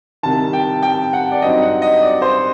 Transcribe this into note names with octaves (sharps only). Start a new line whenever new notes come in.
C2 C3 D#3 A5
G5
G5
F#5
D5
G2 F#3 C4 D#4 D#5
F#5
D#5
D5
C5